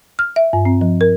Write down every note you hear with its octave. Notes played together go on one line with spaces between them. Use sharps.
F6
E5
G2
C4
F3
A#4